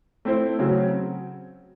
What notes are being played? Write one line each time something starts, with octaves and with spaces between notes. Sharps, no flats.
A3 C4 E4 C5
C#3 F#3 C4